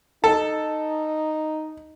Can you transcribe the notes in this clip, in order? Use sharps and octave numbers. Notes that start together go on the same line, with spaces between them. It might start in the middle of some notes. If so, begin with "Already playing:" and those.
D#4 A4